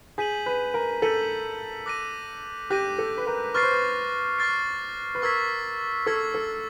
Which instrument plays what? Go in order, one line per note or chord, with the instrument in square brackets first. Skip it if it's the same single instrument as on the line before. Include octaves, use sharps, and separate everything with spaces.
[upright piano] G#4 [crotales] G6 B6 D#7 F#7
[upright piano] B4
A#4
[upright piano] A4 [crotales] G6 B6 D#7 F#7
[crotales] D6 F#6 A#6 D#7
[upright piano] G4 [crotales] D6 F#6 A#6 D#7
[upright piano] A4
B4
A#4
[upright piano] B4 [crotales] C#6 F6 A6 C7
[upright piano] C5
B4
[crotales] C#6 F6 A6 C7
[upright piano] B4
[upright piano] A#4 [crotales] C#6 E6 G#6 B6
[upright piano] A4 [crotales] C#6 E6 G#6 B6
[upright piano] A4